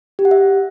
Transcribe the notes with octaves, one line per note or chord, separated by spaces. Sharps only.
G4
F#5
E5